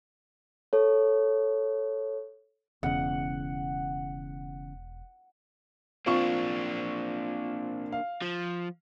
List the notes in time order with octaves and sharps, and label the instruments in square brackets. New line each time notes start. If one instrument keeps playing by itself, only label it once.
[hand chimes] A4 C#5
[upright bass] E1 [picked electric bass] E2 C#3 [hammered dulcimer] F#5
[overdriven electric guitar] A#3 D4 [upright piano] C4 F4 C#6
[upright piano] F5
[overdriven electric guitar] F3